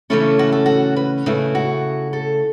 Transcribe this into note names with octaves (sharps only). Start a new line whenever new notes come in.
C#3 E3 A3 C#4 E4 A4
F#4
A4
F#4
B4
C#3 A3 E4
F#4
A4